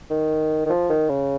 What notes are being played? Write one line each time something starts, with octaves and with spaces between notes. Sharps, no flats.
D#3
D#3
F3
D#3
C#3